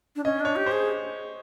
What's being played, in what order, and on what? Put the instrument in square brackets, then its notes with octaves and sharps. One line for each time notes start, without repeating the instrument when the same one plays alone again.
[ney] D4
[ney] C#4 [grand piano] D#5
[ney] D4 [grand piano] C#5
[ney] G4
[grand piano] C5
[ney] G#4